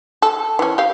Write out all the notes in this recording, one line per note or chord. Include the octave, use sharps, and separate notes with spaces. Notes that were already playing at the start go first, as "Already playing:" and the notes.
A4
E3 C#4
G4 F5